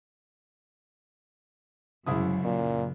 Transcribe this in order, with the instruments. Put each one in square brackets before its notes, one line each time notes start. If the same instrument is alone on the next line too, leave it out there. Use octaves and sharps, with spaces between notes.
[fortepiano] C2 E4 D#6 [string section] F#2 [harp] C#3 G#3
[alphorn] A#2